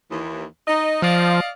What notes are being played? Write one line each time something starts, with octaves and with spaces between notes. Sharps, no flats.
D#2 E3
D#4 D#5
F3 D5 D#5 F5